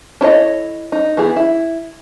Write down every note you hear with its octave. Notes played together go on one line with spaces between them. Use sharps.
D4 E4 A4 C#5 D#5
D#4
E3 B3 G#4
E4